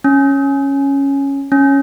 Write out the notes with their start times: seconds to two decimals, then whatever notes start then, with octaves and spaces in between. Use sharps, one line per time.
0.04 C#4
1.52 C#4